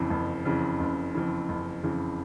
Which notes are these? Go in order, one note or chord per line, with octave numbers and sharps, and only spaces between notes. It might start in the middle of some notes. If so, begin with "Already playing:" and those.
Already playing: F#1 F2 C#3 E3
F#1
F2 C#3 E3
F#1
F2 C#3 E3
F#1
F2 C#3 E3